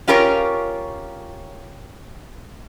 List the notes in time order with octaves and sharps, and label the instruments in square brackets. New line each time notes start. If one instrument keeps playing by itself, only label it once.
[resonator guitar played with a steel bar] C#4 F4 G4 A#4 C#5